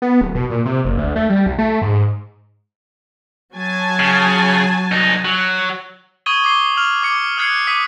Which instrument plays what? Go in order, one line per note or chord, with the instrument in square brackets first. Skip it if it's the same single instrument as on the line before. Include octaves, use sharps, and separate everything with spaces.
[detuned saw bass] B3
D1
B2
A#2
C3
F#1
D2
A3
G3
C2
A3
G#2
[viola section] F#3 G#5 A5
[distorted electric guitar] C#3
C2 D#4
F#3
[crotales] C#6 D#6 G#6 D#7 G7
D6 C7 G7
F6 F7 F#7
D6 C#7
D#6 F6 F#6 G#6 C7 C#7
D6 D#6 B6 D#7